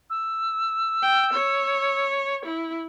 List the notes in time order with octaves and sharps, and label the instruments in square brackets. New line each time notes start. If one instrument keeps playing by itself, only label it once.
[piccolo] E6
[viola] G5
C#5
E4